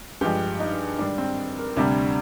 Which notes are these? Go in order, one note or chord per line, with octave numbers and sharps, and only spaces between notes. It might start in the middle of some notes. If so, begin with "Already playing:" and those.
G2 F3 G#3 G4
D#4
G#2 D#3 G3 D4
C4
A#4
D2 C3 G3 D4